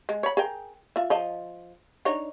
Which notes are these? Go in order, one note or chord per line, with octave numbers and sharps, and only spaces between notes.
G#3
C#5 B5
G#4 A#4 G5
F4 E5
F3 D#5 A5
D4 D#4 C#5